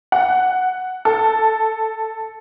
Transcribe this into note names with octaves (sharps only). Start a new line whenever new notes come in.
F#5
A4